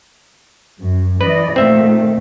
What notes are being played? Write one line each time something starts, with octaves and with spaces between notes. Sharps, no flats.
F#2
E3 B4 D5 D#5
A#2 D#3 A3 C4 E5